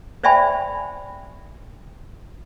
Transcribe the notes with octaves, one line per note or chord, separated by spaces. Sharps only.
C5 D5 E5 G5 G#5 B5